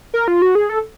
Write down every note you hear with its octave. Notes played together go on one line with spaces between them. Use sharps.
A#4
F4
F#4
G#4
A4